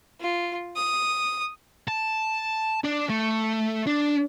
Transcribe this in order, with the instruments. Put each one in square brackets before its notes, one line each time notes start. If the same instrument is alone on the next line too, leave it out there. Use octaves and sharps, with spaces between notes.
[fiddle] F4
D#6
[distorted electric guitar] A5
D4
A3
D4